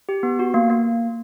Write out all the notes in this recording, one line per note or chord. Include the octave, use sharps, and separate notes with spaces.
G4
B3
F#4
A#3
A#3